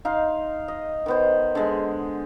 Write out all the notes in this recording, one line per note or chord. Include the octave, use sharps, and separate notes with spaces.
D#4 F5 C6
D#5
D#3 B3 C5
D3 G#3